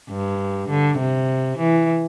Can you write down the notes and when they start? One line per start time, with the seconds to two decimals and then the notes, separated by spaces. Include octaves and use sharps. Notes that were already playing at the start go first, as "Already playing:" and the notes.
0.10 G2
0.70 D3
0.99 C3
1.58 E3